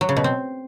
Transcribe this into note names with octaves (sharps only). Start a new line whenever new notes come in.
F#3
C#3
B2
C4